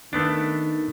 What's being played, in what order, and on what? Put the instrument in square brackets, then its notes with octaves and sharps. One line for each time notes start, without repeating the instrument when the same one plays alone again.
[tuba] D#3 [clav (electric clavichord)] A3 B3 D4